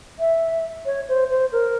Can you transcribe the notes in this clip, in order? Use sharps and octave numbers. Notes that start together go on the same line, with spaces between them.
E5
C#5
C5
C5
A#4